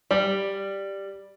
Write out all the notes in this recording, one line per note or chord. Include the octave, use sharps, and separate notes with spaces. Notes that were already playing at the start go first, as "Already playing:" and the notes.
G3 D5